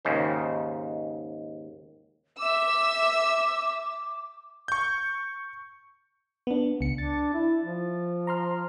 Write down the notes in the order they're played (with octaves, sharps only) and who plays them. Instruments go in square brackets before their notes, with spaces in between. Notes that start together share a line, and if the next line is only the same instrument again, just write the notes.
[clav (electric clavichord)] D#2 G#2 C#3 C5
[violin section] E5 E6 [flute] D6
[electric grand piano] C#6 G6
[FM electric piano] B3 D4
C#2 C#7
[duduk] D4 [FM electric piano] A6
[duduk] E4
F3
[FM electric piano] A#5 C6 F6